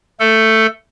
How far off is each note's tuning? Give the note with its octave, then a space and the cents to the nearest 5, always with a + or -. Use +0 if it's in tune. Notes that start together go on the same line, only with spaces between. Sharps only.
A3 +10 A4 +10